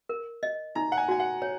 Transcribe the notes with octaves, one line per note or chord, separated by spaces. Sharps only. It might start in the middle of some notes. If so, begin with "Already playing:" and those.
A#4
D#5
D#4 A#5
F#5
G#5
F#4 G#5
F#5
C#5